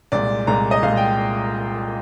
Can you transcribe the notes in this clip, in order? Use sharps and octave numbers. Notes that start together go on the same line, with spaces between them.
C2 A#2 G#3 D5
C2 A#2 G#3 A#5
D#5
C2 A#2 G#3 F5
G5